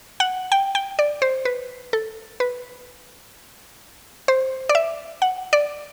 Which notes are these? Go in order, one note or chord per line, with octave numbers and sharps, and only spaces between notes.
F#5
G5
G5
D5
C5
B4
A4
B4
C5
D5
E5
F#5
D5